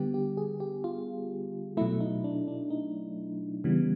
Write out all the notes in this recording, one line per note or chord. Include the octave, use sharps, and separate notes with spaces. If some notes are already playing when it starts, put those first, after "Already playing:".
Already playing: D3 G3 B3 G4
G4
G#4
G4
F4
B2 F#3 A3 E4
D#4
D4
D4
D#4
C#3 E3 G3 B3